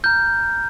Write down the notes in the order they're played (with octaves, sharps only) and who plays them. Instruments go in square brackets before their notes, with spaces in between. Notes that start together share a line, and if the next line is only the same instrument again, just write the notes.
[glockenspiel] A#5 F6 G6